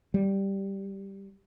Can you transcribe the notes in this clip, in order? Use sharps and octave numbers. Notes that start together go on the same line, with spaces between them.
G3